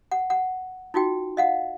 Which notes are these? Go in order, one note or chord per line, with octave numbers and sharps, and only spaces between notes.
F#5
F#5
D#4 F4 F#4 G5
D#5 F5 F#5